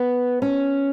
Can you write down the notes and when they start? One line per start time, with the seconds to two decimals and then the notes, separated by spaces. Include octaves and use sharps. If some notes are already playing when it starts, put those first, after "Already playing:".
Already playing: B3
0.42 C#4